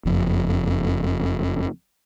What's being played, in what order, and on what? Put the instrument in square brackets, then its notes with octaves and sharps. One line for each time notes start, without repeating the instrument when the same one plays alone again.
[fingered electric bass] F#1 F2